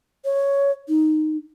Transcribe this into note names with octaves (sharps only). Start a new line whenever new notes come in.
C#5
D#4